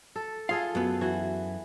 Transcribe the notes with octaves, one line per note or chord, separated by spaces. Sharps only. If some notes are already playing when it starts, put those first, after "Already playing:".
A4
F4 G#4 A4 F5
F#2 B3
E3 F#4